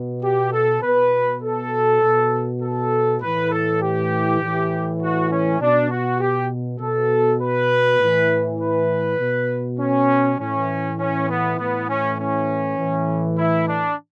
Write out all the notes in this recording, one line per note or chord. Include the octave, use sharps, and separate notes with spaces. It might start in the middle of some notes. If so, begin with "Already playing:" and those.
Already playing: B2
G4
A4
B2 B4
A4
B2
A4
A2 E3 B4
A4
G4
A2 E3
F#4
C#4
B2 D4
F#4
G4
B2 A4
B4
A2 E3
B4
B2
C#4
A2 E3 C#4
C#4
B3
A2 E3 B3
C#4
C#4
A2 E3
E4
D4